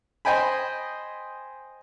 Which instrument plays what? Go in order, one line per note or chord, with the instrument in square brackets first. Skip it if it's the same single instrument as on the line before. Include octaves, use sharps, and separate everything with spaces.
[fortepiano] C5 D#5 G5 G#5 B5